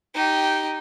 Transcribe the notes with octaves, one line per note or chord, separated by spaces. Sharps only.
D#4 G4